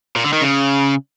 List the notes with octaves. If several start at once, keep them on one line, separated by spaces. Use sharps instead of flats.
A#2
D3
D#3
C#3